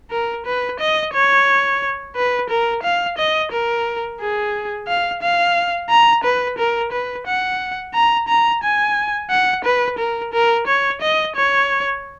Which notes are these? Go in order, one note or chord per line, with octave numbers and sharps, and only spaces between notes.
A#4
B4
D#5
C#5
B4
A#4
F5
D#5
A#4
G#4
F5
F5
A#5
B4
A#4
B4
F#5
A#5
A#5
G#5
F#5
B4
A#4
A#4
C#5
D#5
C#5